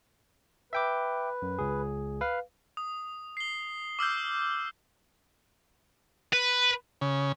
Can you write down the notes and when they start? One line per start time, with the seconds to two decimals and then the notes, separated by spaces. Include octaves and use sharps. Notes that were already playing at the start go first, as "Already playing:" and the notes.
0.73 B4 E5 G5 D6
1.42 F#2
1.59 C#2 G#4
2.21 B4 F5
2.77 D#6
3.37 C7 G7
3.99 D6 E6 F6 G6
6.33 B4
7.01 C#3